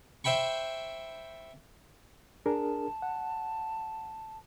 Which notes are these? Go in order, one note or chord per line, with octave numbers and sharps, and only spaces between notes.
C5 E5 G5 B5 C#6
D4 G#4 A#4 A5
F#5